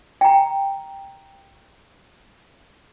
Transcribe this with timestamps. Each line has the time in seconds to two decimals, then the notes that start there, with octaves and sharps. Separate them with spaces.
0.21 G5 A#5